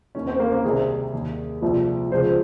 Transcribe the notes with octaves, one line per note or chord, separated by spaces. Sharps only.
D#2 D#3 C#4
C4
A#3
A#3
C2 C3 D#3 G#4
D#2 D#3
C2 A#2 F3
C#2 C#3 F3 C5